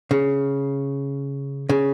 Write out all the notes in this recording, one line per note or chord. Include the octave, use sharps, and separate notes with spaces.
C#3
C#3